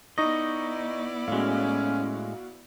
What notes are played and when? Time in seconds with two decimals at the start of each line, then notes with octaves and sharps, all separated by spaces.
0.18 B3 D#4 E4 D5 D#5 C#6 A#6
1.28 A2 G#3 C#4 F#4 F5